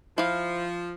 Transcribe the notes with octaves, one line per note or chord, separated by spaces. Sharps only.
F3 E4 F5